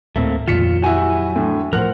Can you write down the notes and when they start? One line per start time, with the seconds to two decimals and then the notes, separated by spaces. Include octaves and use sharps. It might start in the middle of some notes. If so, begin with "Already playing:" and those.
0.16 D1 A2 A3 A#3 C4
0.48 F2 A#2 D#3 F4 B6 C#7 E7
0.82 F#3 E4 F#4 G4 G#5
1.36 A2 D3
1.73 A2 F3 A#4 C5 F#5 F#6